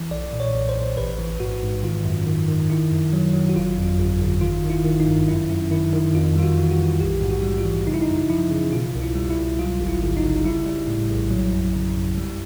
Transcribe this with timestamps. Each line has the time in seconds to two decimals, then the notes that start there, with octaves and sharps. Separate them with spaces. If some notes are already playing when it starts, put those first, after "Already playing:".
Already playing: E3
0.11 B1 D5
0.33 A#2
0.40 C#5
0.54 B1
0.69 C5
0.76 B1
0.97 A1 B4
1.19 E3
1.40 G#2 F#4
1.62 G#2
1.83 D#3 F4
2.05 F#2
2.27 D#3
2.48 D#3
2.70 D#3 E4
2.91 F#2
3.13 F#3
3.34 F#3
3.49 F#4
3.56 G1 F4
3.78 F2
3.98 G1
4.21 G1
4.41 D#3 F4
4.64 D#3
4.70 E4
4.84 D#3
5.00 D#4
5.06 G2
5.28 F#2 E4
5.50 F#2
5.71 D#3 E4
5.93 D#3
6.14 F2 F4
6.36 G3 F4
6.43 F#4
6.58 E3
6.71 F#4
6.78 E3
7.00 A#1 G4
7.22 G#2
7.29 F#4
7.43 G3
7.58 F4
7.65 E3
7.87 C#3 D#4
7.94 E4
8.02 D#4
8.08 F#2
8.30 F3 E4
8.51 C#3
8.72 B2 F4
8.95 C2
9.02 E4
9.15 G3
9.30 E4
9.38 C2
9.59 F#3 F4
9.80 G1
9.88 E4
10.02 G1
10.17 D#4
10.24 C#3
10.37 D#4
10.44 G3 E4
10.66 G3
10.88 A2
11.10 A#1
11.31 F#3
11.53 F#2
11.75 C#3
11.96 F#2
12.18 G3